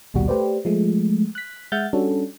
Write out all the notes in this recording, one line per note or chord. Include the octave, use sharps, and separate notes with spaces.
A#1 D#2 B2 G3 F#4
A3 G4 B4 C5 D5
F3 G#3 A3
F#6 B6
G#3 E5 F#5 F6 G6 A6
G3 C#4 D4 F#4 A4